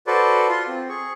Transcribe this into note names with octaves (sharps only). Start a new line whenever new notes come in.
F#4 A4 B4 C5 D5
F4 C6
C4
G#4 C#6